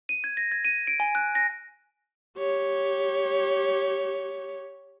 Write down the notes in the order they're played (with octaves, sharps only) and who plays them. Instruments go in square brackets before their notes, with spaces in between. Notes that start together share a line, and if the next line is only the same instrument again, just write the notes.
[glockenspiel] D#7
G#6
A#6
G#6
D#7
D7
G#5
F#6
A#6
[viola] G4 C#5